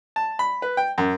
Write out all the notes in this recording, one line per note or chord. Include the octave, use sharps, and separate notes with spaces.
A5
B5
B4
G5
F#2